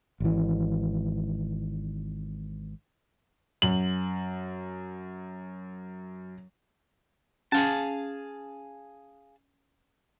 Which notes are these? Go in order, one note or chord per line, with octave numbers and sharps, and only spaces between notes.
G#1 E3
F#2 F#7
C#4 G#4 F5 A5